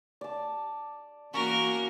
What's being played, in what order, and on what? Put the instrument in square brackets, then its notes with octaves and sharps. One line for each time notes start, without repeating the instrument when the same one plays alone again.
[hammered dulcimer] D5 A5
[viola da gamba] E2 A#3 F#4 [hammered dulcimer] C#4 [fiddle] A#4